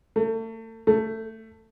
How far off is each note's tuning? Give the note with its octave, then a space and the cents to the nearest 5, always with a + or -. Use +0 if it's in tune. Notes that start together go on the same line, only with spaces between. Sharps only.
A3 +35
A3 +15